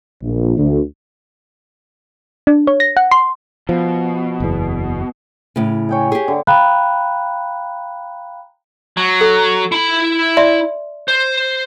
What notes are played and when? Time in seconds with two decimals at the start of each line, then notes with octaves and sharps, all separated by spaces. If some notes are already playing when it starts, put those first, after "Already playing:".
0.22 A#1
0.57 D2
2.47 D4
2.67 C#5
2.80 A#6
2.97 F#5
3.11 C6
3.69 B2 F3
4.40 F#1 E2
5.56 A2 C#3
5.89 C#5 G5 G#5
6.12 G4 G#4
6.28 D3
6.47 F5 G5 A#5 B5 F#6
8.97 F#3
9.21 A4
9.72 E4 B5
10.37 D5 E5 C6
11.08 C5